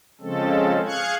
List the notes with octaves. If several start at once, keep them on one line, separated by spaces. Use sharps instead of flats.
C#3 F3 G#3 C4 C#4 A4
G#4 F5 C#6 F#6 G#6